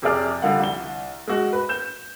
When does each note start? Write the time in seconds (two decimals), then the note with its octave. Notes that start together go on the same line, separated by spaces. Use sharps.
0.02 F2 C3 F3 G#4 D5 F6
0.42 D3 F3 G3 F5 F#5
0.60 C2 G7
1.28 G#3 F#4
1.53 B4
1.69 G6 E7